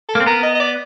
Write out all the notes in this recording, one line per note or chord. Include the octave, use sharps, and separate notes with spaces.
A4
A#3
C4
B3 A#4
D#5
D#5
D5